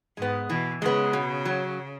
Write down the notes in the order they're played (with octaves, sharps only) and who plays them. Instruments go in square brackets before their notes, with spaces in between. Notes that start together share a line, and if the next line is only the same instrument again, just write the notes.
[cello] G#2 [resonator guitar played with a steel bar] G#3 B3
[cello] B2 [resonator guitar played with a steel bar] E3
[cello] C#3 [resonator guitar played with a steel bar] G#3 B3
[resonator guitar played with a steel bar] B2
F#3